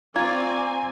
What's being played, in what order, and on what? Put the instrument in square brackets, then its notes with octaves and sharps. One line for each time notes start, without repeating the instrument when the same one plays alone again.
[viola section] C4 G#5 [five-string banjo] F4 [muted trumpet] D5 [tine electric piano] A#5 G#6